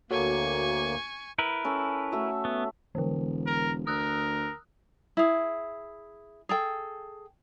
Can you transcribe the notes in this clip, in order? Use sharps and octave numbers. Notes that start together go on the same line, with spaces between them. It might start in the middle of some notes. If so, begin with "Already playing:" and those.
D2 A#3 F#4 A4 C#5 G#5 C#6
E4 A#4 B4
C#4 A4
A3 F#4 E5
B3
E1 D3 E3
A#4
D2 A#4 D#6 E6 F#6
E4 G#4
G#4 A4 G5